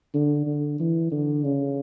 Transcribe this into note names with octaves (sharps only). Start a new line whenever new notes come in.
D3
D3
E3
D3
C#3